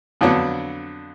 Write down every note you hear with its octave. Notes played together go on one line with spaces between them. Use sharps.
F2 D3 F#3 B3 D4